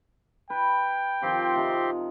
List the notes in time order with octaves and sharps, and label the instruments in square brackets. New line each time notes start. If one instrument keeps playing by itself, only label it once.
[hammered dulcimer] B4 [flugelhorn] G5
[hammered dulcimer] D#3 F3 [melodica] C4 G4 C6
[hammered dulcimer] C3 F3 D#4